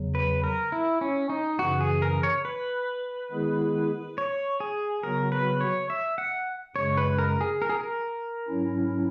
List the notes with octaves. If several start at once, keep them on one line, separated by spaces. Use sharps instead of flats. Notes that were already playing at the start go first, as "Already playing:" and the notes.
Already playing: E2 C#3 F#3
B4
A#4
E4
C#4
D#4
F#2 C#3 E3 F#4
G#4
A#4
C#5
B4
D#3 G#3 B3 E4 G#4
C#5
G#4
C#3 F#3 B3 F#4 A#4
B4
C#5
E5
F#5
F#2 C#3 G#3 C#5
B4
A#4
G#4
A#4
G#4
A#4
G#2 F#3 C#4 E4